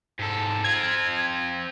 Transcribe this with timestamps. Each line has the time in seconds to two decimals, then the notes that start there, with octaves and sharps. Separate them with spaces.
0.19 G#2 A4
0.64 C4 F4 G#6